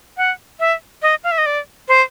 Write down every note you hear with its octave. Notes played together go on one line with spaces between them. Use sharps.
F#5
E5
D#5
F5
E5
D#5
D5
C5